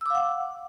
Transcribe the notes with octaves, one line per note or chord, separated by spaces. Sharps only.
F5 F#5 D6 E6